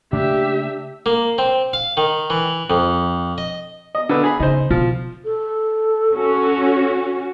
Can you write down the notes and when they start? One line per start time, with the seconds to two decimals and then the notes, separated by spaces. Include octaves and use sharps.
0.13 C#3 A3 A#3 D4 G4 E5
1.06 A#3
1.38 C4
1.73 F5
1.97 D#3
2.30 E3
2.70 F2
3.38 D#5
3.95 D#5
4.09 D3 B4 E6
4.24 G#4 B5
4.40 C#3 D#4 C5
4.70 B2 F3
5.25 A4
6.13 C#4 F#4